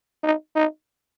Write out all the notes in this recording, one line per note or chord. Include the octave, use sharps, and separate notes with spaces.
D#4
D#4